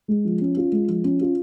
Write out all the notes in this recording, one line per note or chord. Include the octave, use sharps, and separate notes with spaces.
G#3
F3
C#4
F4
G#3
F3
C#4
F4